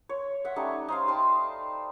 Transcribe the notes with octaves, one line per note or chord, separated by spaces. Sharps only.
C#5
E5 F#5
G3 A3 C#4 D#4
D#4 C5 F5
G5 A5 C6